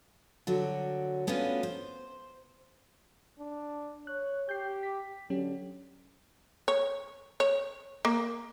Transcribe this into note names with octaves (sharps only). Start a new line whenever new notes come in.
D3 F#3 F#4 C#5
A3 B3 C#4 D4 F4 F#4
C5
D4
C#5 F#6
G4 G6 C7
B6
D3 F#3 C#4 G4
C#5
C#5
A#3